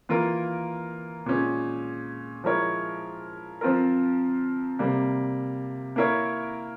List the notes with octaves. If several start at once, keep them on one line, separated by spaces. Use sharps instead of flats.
E3 A#3 F4 A#4
A#2 G#3 C#4
F3 G#3 E4 A#4 C#5
F3 C4 F4 A#4
C3 G3 A#3
A#3 E4 A#4 C#5